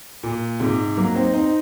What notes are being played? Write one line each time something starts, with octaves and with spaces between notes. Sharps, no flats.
A#2
G#2 C3
F#3 A#3
C4 D#4
C4 D#4